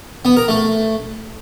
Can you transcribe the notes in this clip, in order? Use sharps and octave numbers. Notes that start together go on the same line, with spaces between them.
B3
A#4
A3